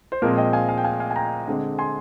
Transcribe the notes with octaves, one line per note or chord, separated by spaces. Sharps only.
C5
A#2 F3 G#3 C4 A#4
D#5 G5
F5 G#5
F5 G#5
G5
F5 G#5
F5 G#5
G#5
G5 A#5
D3 G#3 C4
G#5 C6